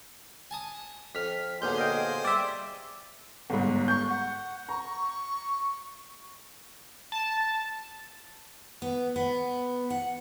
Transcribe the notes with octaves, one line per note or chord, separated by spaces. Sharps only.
G#5 A5 D#6
F2 F6 B6
B1 A#2 D3 G#4 C5 G6
D#5 F5 G5
G3 D5 E5
G1 G#2
C#6 G6
F#5
A#5 C#6
A5
B3
B3
F#5